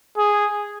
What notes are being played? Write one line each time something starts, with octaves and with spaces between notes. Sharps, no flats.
G#4